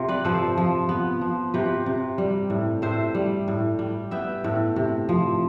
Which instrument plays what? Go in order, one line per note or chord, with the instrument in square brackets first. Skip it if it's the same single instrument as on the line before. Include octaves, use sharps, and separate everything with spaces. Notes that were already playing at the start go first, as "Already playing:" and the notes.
Already playing: [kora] C3 F4
B4 D5
F3 A4 C5
F3
B3
F3
C3 G4 B4
C3
G3
A2
A2 C5 E5
G3
A2
G3
B3 E5 G5
A2
C3
F3